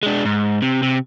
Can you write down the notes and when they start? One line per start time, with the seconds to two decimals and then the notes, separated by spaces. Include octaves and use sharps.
0.03 G#3 D4
0.25 G#2
0.62 C3
0.83 C3